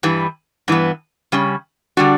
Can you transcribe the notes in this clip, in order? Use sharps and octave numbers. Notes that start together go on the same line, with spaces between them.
G2 E3 G3
G2 E3 B3
C#3 G3 C#4
D3 G3 D4 F#4